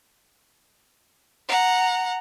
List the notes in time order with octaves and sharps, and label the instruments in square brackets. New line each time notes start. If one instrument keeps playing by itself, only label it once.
[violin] F#5 A#5